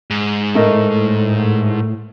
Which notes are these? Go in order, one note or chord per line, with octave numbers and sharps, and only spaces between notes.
G#2
A2 A3 A#4 D#5